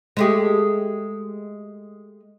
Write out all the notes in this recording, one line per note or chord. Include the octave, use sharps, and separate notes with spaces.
G#3 A3 G4